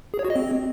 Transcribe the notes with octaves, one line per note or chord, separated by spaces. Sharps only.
G#4
C#5
F#4
D#5
C4